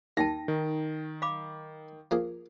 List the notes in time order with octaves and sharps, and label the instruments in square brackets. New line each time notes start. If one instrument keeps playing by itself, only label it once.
[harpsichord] D#2 [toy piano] D#4 G5 A5 [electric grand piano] A#6
[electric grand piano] D#3
[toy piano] F5 B5 D6
[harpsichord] F3 A#3 G#4